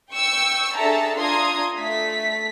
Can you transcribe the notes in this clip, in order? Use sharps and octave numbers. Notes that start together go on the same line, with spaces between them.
G5 C#6 E6
D4 G#4 A4 E5 A5 A#5
D4 F4 A#5 C6 D#6 G#6
A3 B6